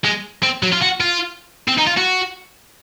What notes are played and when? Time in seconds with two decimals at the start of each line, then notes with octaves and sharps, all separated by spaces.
0.05 G#3
0.43 C4
0.63 F#3
0.72 F4
0.82 F#4
1.00 F4
1.68 C4
1.78 D#4
1.87 F4
1.97 F#4